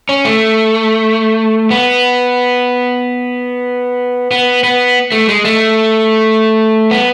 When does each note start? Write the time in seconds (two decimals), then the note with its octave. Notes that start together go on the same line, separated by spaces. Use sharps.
0.09 C#4
0.25 A3
1.71 B3
4.31 B3
4.64 B3
5.12 A3
5.29 G#3
5.45 A3
6.91 B3